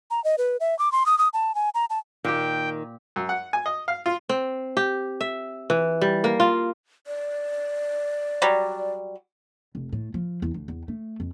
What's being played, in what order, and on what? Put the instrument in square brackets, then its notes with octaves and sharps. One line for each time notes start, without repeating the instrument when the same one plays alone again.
[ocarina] A#5
D#5
B4
E5
D6
C6
D#6
D#6
A5
G#5
A#5
A5
[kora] A#2 G4 [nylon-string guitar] D#3 [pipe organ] G5
[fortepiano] F#2
F#5
G#5
D#5
F5
F4
[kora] C4
G4
E5
E3
G3
A#3
F4
[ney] D5
[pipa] F#3 G3
[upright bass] F1
A2
F3
E2
D2
E2
A3
F2